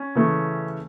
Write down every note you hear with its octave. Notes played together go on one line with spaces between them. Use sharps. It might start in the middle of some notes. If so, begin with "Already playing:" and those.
Already playing: C#4
C#3 E3 A3